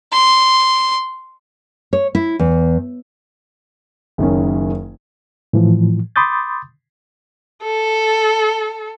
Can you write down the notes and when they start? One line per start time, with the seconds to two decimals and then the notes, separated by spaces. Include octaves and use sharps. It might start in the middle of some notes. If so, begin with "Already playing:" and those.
0.13 C6
1.93 C#5
2.15 E4
2.39 E2
4.18 F#1 D#3 C#4
5.53 A2 E3 F3
6.16 B5 C6 D6 D#6 G6 A6
7.63 A4